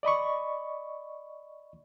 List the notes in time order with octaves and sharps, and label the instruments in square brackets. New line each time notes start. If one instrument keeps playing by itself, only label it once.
[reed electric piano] D5 D#5 B5 C#6